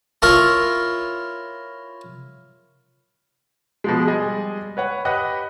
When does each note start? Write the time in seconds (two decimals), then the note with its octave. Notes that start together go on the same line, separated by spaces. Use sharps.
0.22 E4 F4 A#4 C#5
3.84 B2 F3 G#3
4.07 G3 G#3 G#4 D#5
4.77 B4 C#5 F#5
5.05 G4 B4 D#5 F#5 F#6